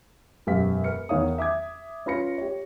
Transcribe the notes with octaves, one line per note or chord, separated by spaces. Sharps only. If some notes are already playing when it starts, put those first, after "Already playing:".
E1 F#2 G4 B4 F5 B6
B4 F6 C#7
E2 D#3 C#5 F5 D#6
E5 D6 D#6 G#6
C#4 F4 B4 B5 A#6 C#7
G4 C#5